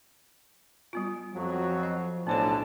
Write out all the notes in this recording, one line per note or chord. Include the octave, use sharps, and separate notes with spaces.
G3 B3 F4
F2 F3 F#3 F#4
D#5
B1 A2 D3 B3 C5 C#5 A5